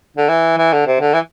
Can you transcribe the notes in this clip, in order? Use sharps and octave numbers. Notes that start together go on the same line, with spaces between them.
D3
E3
E3
D3
C3
D3
E3